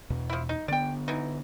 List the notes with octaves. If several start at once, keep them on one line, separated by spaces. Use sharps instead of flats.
E2 B2
F3 E4
D#4
D3 B3 D5 G5
E3 F#3 D#4